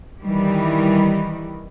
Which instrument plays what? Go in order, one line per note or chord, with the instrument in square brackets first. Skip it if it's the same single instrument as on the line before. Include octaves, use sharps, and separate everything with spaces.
[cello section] D#3 E3 G3